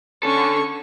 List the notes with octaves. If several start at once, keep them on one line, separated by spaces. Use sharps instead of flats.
D3 C#4 A4 C#6